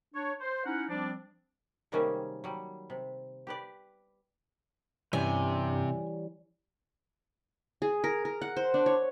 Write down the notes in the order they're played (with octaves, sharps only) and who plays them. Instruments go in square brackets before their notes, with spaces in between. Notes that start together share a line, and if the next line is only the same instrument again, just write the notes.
[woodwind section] D4 C#5
C5
C#4 D#4 E4 F#5
F3 G3 C4 D4
[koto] C3 D#3 G3 G#3 A#3 C#4
F#3 G3
C3
G4 B4 D5
[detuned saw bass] G2 [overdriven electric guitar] C3 [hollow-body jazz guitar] E3 G3 C#4 [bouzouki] G#5
[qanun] G#4
A#4
A#4
F#5
C5
D4
C#5